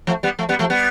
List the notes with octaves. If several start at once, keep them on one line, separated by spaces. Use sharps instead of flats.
F3 A3
G3 B3
F3 A3
G3 B3
F3 A3
G3 B3